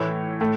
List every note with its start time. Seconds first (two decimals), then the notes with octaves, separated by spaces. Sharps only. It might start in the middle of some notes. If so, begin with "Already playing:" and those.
Already playing: A2 E3 A3 E4 C#5
0.41 A2 A3